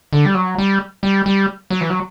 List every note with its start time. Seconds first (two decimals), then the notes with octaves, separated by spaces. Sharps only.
0.13 D3
0.25 G3
0.35 F#3
0.58 G3
1.03 G3
1.26 G3
1.70 F#3
1.81 E3
1.90 F#3